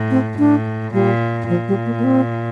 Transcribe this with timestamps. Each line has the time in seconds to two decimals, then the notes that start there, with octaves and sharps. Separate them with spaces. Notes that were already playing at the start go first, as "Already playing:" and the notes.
Already playing: A2
0.11 C4
0.38 A2 D4
0.93 A#2 G3
1.49 A#2 F3
1.68 G3
1.86 A#3
1.99 A#3
2.04 C4